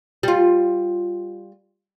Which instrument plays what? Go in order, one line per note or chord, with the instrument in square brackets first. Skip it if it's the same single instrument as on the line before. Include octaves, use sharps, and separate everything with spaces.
[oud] G3 F4